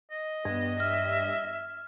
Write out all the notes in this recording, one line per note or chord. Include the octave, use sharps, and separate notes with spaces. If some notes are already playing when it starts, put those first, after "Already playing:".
D#5
G2 B3 G#6
E5 F6